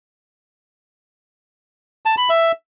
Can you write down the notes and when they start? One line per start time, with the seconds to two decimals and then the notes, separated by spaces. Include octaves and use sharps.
2.06 A5
2.17 B5
2.29 E5